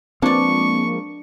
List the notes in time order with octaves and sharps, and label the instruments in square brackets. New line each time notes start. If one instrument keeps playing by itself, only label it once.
[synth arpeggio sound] F3 G#3 A#3 [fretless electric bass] C4 [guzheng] D4 D5 [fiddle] C#6